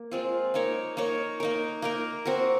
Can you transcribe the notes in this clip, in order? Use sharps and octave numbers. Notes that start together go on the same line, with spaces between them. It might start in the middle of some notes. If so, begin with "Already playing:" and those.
Already playing: A#3
G#3 C4 F4
A#3 D#4 A#4 C#5
A#3 D#4 A#4 C#5
A#3 D#4 A#4
A#3 D#4 A#4
C4 F#4 A#4